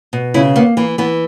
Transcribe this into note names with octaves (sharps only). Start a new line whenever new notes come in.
B2
C#3 E4
A#3 B3
E3 A#3
E3 B3